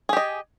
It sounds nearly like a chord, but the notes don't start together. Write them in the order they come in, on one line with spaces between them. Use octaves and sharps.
G#4 G4 D#5